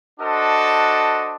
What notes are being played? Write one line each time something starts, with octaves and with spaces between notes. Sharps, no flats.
D4 F#4 A4 C5 D#5